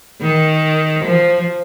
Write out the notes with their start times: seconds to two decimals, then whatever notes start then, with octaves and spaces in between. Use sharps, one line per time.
0.21 D#3
1.04 F3